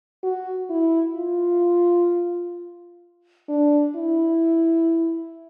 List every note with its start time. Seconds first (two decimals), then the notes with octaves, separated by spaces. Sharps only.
0.23 F#4
0.70 E4
1.16 F4
3.49 D4
3.96 E4